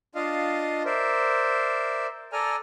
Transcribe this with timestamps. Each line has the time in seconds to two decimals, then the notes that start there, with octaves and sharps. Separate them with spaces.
0.15 D4 F4 D#5 F5
0.85 A#4 C5 D5 E5
2.33 A4 D5 G#5 A#5 F6